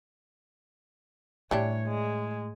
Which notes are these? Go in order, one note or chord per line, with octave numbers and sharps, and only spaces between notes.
A2 E3 G3 D4 C#5
G#3